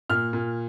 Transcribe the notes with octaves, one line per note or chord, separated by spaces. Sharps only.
A#2 F6
A#2